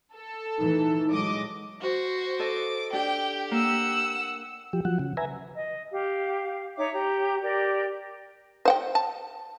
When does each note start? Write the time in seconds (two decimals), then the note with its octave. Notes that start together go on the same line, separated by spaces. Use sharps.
0.14 A4
0.59 E3 A3 D#4
1.12 A#2 F#3 G#3 D#5 D6
1.81 F#4 C5
2.39 A4 D#5 D6
2.93 D4 G4 G5
3.51 A#3 F#5 E6
4.73 F3 G4
4.85 F3 F#3 F#5
4.99 C#3
5.17 B4 E5 G#5 A#5
5.55 D#5
5.91 G4 F5
6.76 D#4 C#5 E5 D6
6.93 G4 A#5
7.42 G4 A#4 D5
8.65 C5 F#5 G5
8.95 A5